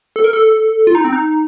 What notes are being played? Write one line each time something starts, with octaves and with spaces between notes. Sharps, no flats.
A4
A#4
A4
F4
D#4
C4
D#4